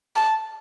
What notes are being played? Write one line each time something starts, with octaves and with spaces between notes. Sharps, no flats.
A5